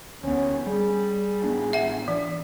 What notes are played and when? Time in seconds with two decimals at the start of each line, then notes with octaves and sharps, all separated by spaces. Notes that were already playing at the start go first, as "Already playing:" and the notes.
0.23 D2 B3 C#4
0.66 G3 G#4
1.44 A1 B3 D4
1.73 E5 F#5
2.08 E3